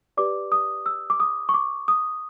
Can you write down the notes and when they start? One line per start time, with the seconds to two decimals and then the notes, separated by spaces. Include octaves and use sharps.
0.17 G4 B4 D5 D6
0.52 D#6
0.86 E6
1.10 D6
1.20 D#6
1.49 C#6
1.54 D6
1.88 D#6